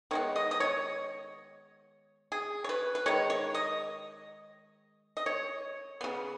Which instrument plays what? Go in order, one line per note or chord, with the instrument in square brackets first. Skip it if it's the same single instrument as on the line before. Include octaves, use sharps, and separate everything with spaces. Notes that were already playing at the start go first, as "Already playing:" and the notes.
[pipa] D#3 G#3 B3 C#5
D#5
D#5
C#5
G#4
C#5
B4
B4
D#3 G#3 C#5
C#5
D#5
D#5
C#5
C#3 B3